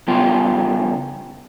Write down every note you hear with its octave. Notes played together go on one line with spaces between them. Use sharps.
C#3 G3 B3 F4 G5